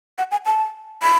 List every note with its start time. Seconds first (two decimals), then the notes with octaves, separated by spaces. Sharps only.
0.18 F#5
0.31 G#5
0.46 A5
1.02 B5